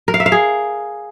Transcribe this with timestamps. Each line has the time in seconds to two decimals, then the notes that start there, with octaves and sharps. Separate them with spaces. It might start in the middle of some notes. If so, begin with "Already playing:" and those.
0.08 A#4
0.14 F5
0.20 E5
0.26 F5
0.32 G#4